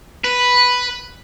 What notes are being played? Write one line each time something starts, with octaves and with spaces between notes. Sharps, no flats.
B4